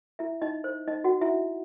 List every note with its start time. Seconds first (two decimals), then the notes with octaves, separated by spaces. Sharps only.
0.19 E4 E5
0.42 D#4 D#5
0.64 C5
0.88 D#4 D#5
1.04 F#4 F#5
1.21 E4 E5